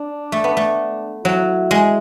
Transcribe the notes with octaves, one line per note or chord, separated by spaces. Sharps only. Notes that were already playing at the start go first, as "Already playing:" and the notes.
Already playing: D4
A3
B3
A3
F#3 E4
G#3